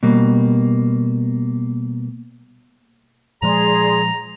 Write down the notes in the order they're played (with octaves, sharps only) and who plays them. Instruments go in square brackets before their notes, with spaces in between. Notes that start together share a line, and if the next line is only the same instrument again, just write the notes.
[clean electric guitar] B2 G3 A#3
[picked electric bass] A#2 F3 G#3 [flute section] G#4 D5 C6 [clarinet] A#5